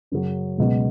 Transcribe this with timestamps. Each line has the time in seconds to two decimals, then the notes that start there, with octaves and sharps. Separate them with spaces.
0.12 F#2 C#3 F#3
0.58 C#2 B2 F#3